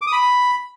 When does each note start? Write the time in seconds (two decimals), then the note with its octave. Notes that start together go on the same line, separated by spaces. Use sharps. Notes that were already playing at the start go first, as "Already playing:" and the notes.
0.02 D6
0.07 D#6
0.12 B5